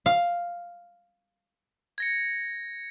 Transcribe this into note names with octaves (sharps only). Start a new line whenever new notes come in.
F5
G#6 A#6 C#7